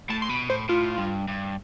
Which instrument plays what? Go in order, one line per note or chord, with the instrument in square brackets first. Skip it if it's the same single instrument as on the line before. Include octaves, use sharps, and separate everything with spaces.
[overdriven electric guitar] A2 [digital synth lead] A5
[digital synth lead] C6
[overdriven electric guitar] B2 [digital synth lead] B5
[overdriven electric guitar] A2 [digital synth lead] C5
[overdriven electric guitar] A2 [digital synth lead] F4
[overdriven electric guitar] G2
G2